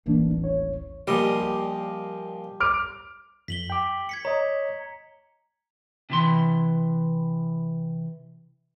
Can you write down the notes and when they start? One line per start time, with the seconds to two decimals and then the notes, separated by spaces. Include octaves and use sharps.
0.06 D#1 A1 E3 A#3 D4
0.44 C#5
1.07 A#2 F3 G3 D#5
1.40 G4
2.60 D6 F6 D7
3.48 F2 B6 F#7 G7
3.70 G5 D6
4.09 G#6 B6 C#7
4.25 C#5 D#5 A#5
6.10 C3 E3 C6